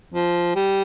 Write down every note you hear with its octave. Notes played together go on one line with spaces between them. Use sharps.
F3
G3